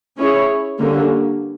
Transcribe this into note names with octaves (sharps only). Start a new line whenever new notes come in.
C#4 E4 G#4 C#5
D3 G3 A#3 C#4